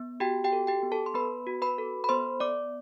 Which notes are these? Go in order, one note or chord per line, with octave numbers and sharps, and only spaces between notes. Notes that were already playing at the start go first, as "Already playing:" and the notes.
Already playing: B3
F#4 G4 G5
G4 G5
A4
G4 G5
B3
A4 A5
C6
B3 B4 B5
F#4
B4 B5
A4
B5
B3 C5 C6
B3 D5 D6